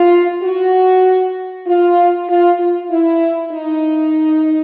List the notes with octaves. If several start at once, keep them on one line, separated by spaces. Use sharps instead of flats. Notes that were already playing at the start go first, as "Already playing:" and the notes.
Already playing: F4
F#4
F4
F4
F4
E4
D#4